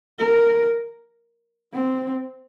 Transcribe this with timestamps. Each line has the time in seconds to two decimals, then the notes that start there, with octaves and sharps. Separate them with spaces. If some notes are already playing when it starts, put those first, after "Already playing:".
0.19 A#4
1.73 C4